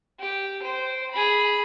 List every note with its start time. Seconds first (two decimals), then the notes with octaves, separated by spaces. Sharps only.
0.19 G4
0.62 C5 G5
1.11 G#4 B5